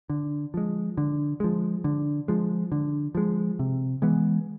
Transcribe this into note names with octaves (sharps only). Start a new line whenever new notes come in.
D3
F3 G#3
D3
F3 G#3
D3
F3 G#3
D3
F3 G#3
C3
E3 G#3 B3